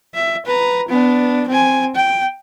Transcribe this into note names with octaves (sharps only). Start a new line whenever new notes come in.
E5
B4 A#5
B3 D4
C4 G#5
G5